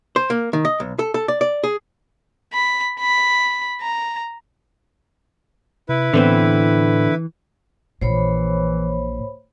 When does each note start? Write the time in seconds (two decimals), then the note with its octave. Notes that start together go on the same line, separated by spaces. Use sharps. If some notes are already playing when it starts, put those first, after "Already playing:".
0.16 C5
0.30 A#3
0.53 D#3
0.65 D#5
0.80 B1
0.99 A4
1.14 A4
1.28 D5
1.41 D5
1.64 G#4
2.54 B5
3.00 B5
3.81 A#5
5.89 C3 E4 B4
6.14 A2 D3 E3 B3 C4
8.01 A#1 A#2 E3 C5 C#5 B5